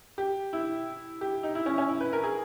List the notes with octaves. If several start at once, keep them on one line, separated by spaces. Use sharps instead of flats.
G4
E4
G4
D#4
E4
C#4
C#4
E4
B4
A#4
G#4